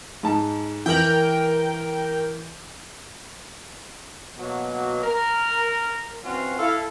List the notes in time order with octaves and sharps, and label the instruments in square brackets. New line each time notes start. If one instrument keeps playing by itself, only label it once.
[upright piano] G#2 A5
[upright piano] E3 G6 F#7 [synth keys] A#4 G5
[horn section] B2 F#3 A#3
A#4
E3 C4 C#4 F4 F#4
E4 A4 F5